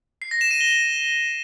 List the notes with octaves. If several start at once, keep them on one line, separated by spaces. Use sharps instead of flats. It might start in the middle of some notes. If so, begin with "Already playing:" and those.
C7
A#6
E7
D#7
G7